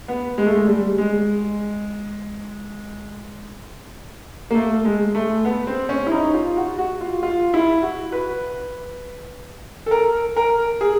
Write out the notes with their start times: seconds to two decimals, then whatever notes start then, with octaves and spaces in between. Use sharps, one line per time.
0.08 B3
0.38 G#3
0.46 A3
0.55 G#3
0.68 G3
0.98 G#3
4.51 A#3
4.55 A3
4.85 G#3
5.15 A3
5.45 B3
5.67 C4
5.89 C#4
6.07 E4
6.12 D#4
6.34 F4
6.57 F#4
6.78 F#4
7.01 F4
7.23 F4
7.54 E4
7.83 F#4
8.12 B4
9.86 A4
9.91 A#4
10.37 A#4
10.81 G#4